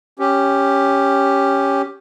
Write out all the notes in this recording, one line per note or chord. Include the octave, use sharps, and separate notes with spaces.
C#4 G4